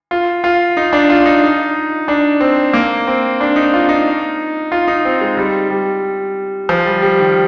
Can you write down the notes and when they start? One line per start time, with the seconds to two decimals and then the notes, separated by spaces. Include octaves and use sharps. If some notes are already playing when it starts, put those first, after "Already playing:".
0.11 F4
0.44 F4
0.77 D#4
0.93 D4
1.10 F4
1.26 D#4
1.43 D#4
2.08 D4
2.41 C4
2.73 A#3
3.07 C4
3.41 D4
3.56 D#4
3.73 F4
3.89 D#4
4.72 F4
4.88 D#4
5.05 C4
5.21 G#3
5.37 G3
5.70 G3
6.69 F3
6.86 G3
7.02 G3
7.19 D#3